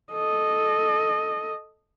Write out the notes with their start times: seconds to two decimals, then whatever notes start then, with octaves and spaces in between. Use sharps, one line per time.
0.13 A4 D#5